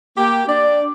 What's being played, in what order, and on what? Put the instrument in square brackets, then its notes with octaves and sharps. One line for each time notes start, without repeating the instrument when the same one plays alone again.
[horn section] A#3 G4
D4 D5